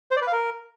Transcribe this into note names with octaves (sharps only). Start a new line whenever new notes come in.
C5
D5
B4
F5
A#4